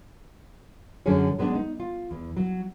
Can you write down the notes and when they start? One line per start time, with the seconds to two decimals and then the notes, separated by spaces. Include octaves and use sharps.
1.06 F#2 D3 F#3 C#4 G#4 C#5
1.39 F#3 G#3 B3 C#4 D4
1.55 D#4
1.80 F4
2.11 E2
2.37 F#3